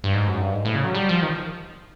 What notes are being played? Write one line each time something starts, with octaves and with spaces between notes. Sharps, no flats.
G2
G#2
F#2
G2
G#2
A2
C#3
F#3
G3
F3
D#3